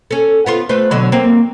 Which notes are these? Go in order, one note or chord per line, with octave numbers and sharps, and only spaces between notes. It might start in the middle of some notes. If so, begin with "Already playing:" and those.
C#4 A4
B3 F4 C5
A3 B4 C5
B2 D3 F#3
F#3 A#3 C4